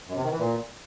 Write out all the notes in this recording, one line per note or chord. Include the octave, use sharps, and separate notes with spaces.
F#2
C3
D#3
E3
A#2